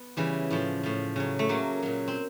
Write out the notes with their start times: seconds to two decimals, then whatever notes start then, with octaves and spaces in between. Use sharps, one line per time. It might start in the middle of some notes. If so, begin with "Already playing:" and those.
Already playing: B3
0.17 C#3 E3 G3
0.50 A2 F3
0.83 A2 F3
1.16 C#3 F#3
1.39 A3
1.49 C#3 F#3 A#3
1.83 A#2 F#3
2.08 C4